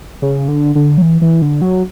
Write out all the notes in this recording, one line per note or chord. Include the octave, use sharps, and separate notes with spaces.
C#3
D3
D3
F#3
E3
E3
D3
F#3